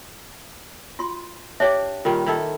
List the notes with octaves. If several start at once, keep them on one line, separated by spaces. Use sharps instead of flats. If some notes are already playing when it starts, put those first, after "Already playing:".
F4 F#4 C6
D4 G4 C#5 D5 E5
A#2 D#3 G3 F4
D#3 E4 A4